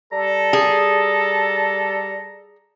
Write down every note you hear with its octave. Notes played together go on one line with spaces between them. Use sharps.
G3 A4 A#5
G#4